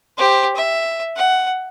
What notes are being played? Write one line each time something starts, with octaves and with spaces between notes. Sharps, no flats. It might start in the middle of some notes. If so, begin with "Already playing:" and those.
G4 C5
E5
F#5